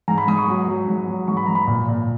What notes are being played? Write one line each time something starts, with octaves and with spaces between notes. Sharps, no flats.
G#2 A#5
B5
G#2 D#6
C#6
F#3
F#3
G#2
F#3
G#2 C#6
B5
G#2 A#5
B5
A#2
A#2